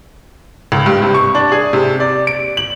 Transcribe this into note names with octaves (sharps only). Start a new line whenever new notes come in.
C#2
G2
C3
C#6
D4
G#4
C3
D5
D7
F#7